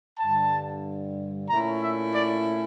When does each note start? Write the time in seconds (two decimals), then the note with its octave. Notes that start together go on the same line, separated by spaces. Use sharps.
0.20 G2 D3 G3 A5
1.50 A#2 A3 C#4 E4 A#5
1.83 E5
2.15 D5